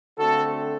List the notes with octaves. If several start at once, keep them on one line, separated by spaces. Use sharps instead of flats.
D3 A3 C4 F#4 A4